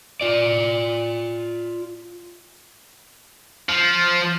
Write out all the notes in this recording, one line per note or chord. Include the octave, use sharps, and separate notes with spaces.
F4 D5
F3